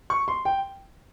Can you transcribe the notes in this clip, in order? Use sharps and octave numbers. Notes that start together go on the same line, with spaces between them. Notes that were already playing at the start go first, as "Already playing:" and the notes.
C#6
C6
G5